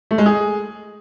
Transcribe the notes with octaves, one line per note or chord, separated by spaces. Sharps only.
A3
G#3
G#4